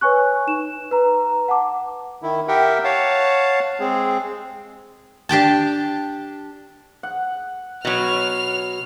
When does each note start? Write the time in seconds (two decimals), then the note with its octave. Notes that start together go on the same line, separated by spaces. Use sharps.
0.01 B4 C#5 G#5 C#6 F#6
0.47 D#4 E7
0.91 B4 A#5
1.48 F#5 A5 D6
2.22 D#3 E4
2.48 G4 A#4 E5 F#5 G5
2.84 C#5 F5 F#5 A5
3.80 G#3 C4 G#4
5.29 D4 G4 G5 A5
7.03 F#5
7.85 B2 F#3 F6